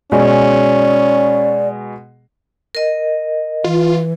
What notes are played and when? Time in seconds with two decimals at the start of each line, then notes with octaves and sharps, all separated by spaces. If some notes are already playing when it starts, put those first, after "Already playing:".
0.12 B2 G#3 C#4 G#4 D5
2.75 A#4 D#5
3.64 E3 F4